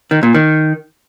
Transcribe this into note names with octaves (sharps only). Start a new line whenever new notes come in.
D#3
A#2
D#3